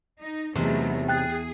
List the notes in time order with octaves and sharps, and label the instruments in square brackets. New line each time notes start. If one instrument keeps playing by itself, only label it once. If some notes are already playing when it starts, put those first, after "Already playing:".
[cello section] D#4
[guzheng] E2 [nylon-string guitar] C3 D#4 [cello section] F#3 A3 B3
[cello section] G#4 [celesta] G5 F#6 A6